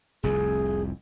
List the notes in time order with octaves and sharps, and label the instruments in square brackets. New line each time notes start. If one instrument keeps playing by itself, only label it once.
[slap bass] F1 C2 F2 [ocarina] G#4